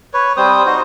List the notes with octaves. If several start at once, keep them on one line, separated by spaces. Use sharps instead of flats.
B4 C#5
G3 C4 C5 D#6
D#4 F#4 C5